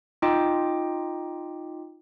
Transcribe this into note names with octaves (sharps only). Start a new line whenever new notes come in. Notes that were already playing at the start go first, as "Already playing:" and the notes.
D#4 F4 D#5 G5 D6